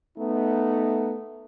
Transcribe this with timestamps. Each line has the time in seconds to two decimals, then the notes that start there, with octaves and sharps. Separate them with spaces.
0.18 A3 B3 D#4